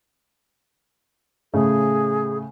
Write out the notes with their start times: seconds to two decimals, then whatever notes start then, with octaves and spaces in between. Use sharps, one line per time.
1.54 A2 C#3 A3 G#4